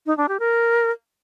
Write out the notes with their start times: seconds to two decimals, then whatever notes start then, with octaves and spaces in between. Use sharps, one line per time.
0.06 D#4
0.17 D4
0.29 G4
0.40 A#4